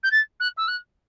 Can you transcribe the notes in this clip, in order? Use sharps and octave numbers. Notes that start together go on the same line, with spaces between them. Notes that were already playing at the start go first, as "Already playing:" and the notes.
G6
A6
F#6
E6
F#6